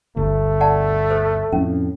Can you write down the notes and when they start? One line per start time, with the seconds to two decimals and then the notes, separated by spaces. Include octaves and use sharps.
0.16 G1 D2 A3
0.61 D5 F#5 A5
1.10 A4 C5
1.52 F2 A2 C#4